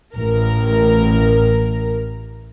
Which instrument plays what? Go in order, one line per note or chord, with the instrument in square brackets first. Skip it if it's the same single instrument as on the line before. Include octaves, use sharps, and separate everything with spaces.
[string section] A1 A#4